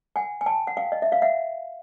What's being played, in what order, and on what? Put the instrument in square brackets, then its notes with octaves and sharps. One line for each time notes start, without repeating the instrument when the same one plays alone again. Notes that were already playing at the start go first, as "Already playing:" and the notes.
[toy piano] F#5 G#5
G#5
G5 A5
F#5
F5 G5
D#5
E5
F5
E5 F#5